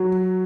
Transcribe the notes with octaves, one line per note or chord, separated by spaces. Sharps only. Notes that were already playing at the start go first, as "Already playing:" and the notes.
Already playing: F#3